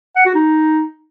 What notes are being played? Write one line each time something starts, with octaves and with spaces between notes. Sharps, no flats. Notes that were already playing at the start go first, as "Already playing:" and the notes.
F#5
F#4
D#4